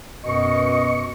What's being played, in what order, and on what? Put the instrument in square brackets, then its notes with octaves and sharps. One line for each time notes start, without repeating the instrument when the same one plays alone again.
[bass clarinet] F#2 [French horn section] B2 [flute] D#5 [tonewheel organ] C#6